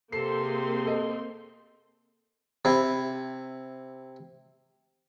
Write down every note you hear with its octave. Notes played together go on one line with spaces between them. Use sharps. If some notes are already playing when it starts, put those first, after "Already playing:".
C3 A#3 C4 A4 C6 C7
G#4
A4 D#5
C3 E4